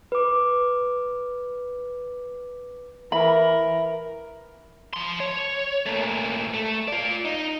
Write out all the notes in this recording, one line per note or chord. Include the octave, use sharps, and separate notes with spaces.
B4 D6
E3 A#4 E5 B5
F3 C6
C#5
A#2 A3
A3
F4 D5
D#4